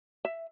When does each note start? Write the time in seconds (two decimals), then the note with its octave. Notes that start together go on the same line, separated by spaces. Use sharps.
0.25 E5